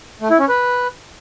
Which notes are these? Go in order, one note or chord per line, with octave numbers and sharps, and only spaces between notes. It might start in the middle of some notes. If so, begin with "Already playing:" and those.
A3
E4
C#4
B4